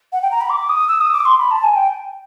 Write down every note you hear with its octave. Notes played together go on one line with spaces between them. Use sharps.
F#5
G5
A#5
B5
D6
D#6
E6
D#6
D6
C6
B5
A5
G#5
G5